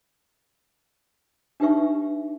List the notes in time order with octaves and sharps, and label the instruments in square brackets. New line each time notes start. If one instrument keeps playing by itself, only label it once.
[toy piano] D4 D#4 G4 B4 E5 C#6